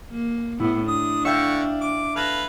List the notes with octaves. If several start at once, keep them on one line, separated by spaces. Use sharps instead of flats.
A#3
A2 B3 E4
D4 D#6
D3 E5 F5 G5 C#6
D6
A4 B4 F5 F#6 G#6 A#6